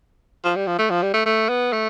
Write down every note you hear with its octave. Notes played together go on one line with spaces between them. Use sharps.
F3
G3
F3
A3
F3
G3
A3
A3
B3
A3